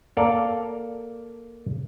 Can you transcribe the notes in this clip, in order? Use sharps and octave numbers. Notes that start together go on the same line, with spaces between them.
A#3 A4 D5 F5